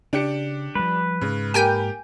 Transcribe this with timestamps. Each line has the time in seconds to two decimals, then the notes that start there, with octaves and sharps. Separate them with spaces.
0.13 C#3 D4 G4 C#7
0.75 F3 G3 B4
1.21 G#2 C#3
1.54 A#3 G4 A#4 G5 G#5 G6